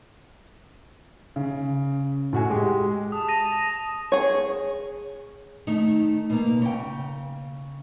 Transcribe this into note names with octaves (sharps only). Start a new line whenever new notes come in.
C#3
A2 F#4 G#5
G#3 G4
A5 D#6
A#6 D#7
G#4 C#5
D#3 A3 D#4
B2 A#3
C#3 G5